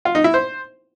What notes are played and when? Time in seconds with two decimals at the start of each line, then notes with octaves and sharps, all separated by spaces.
0.05 F4
0.15 D#4
0.24 E4
0.34 C5